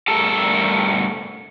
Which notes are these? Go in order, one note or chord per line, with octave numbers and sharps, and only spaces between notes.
G2 A3 A4 A#4 A5